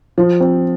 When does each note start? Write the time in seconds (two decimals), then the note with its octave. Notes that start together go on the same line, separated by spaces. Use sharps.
0.18 F3
0.40 C4